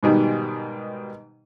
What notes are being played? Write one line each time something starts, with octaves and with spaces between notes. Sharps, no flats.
G#2 B2 D#3 G3